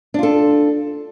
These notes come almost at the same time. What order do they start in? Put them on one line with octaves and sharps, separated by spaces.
D4 F4 A4